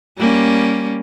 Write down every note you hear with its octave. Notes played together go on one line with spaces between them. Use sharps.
G3 A#3 C#4